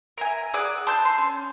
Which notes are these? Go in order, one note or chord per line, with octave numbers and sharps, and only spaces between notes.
A#4 E5 G#5
G#4 D5 F#5 E6
A5 C6 E6 G6
A5 C6
C#4